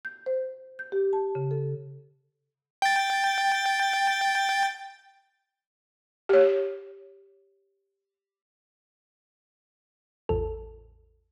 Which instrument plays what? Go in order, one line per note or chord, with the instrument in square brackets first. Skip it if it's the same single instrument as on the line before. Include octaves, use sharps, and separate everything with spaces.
[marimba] G6
C5
G6
G4
A5
C#3
A4
[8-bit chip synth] G5 A6
[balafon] G4 C#5
[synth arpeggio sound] A1 E2 A4